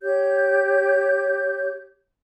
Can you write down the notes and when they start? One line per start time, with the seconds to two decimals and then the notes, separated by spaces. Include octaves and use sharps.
0.02 G4 C#5 G6